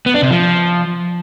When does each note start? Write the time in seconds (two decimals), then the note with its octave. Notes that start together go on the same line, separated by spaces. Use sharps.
0.06 B3
0.14 D4
0.22 C3
0.31 F3